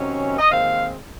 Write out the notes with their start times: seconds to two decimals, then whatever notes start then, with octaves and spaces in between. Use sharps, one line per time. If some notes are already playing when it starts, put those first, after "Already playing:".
Already playing: C3 D#3 F#3 C#4
0.38 D#5
0.50 D#2 D#3 G#3 C4 F5